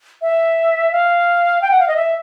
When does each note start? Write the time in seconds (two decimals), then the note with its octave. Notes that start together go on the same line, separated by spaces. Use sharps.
0.22 E5
0.92 F5
1.62 G5
1.71 F#5
1.80 F5
1.88 D#5
1.96 E5